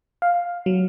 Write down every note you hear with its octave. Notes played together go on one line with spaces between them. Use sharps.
F5
F#3